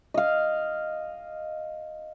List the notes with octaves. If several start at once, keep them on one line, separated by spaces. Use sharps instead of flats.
D#5 F5